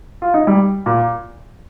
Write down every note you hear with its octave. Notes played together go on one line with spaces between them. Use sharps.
F4
D#4
G3
A#2